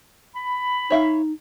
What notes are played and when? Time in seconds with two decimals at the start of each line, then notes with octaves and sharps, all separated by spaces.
0.35 B5
0.90 D#4 C#5 E5 F5